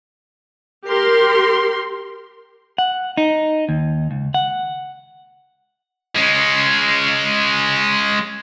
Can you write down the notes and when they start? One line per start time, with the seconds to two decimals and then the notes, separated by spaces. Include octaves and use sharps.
0.87 G4 A#4 C6
2.78 F#5
3.17 D#4
3.69 D#2
4.11 C#2
4.34 F#5
6.15 G#3 C#4